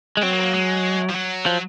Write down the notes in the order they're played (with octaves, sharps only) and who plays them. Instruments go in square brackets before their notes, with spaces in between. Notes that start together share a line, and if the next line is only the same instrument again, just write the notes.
[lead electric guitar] G#3
[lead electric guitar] F#3 [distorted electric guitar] C4
[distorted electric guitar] A#3
C4
A#3
G#3
F3
F#3
[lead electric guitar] F3